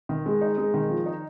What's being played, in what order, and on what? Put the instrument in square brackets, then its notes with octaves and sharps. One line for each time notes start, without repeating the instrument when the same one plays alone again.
[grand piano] D#3
G#3
D#4
G#3
D#3
F3
D#4